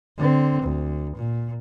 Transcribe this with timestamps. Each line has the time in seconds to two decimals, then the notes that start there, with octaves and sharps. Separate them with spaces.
0.17 D3 C4
0.62 D2
1.16 A#2